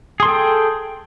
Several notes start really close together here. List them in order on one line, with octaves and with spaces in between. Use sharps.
G#4 C6 A4 G5